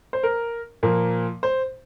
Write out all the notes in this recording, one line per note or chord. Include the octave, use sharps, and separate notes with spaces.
C5
A#4
A#2 F3 A#3
C5